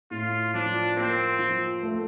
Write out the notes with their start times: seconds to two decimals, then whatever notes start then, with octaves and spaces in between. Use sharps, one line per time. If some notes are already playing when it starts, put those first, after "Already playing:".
0.11 A2 F4
0.54 F3 D4
0.97 A#3 C4
1.39 F3
1.83 A3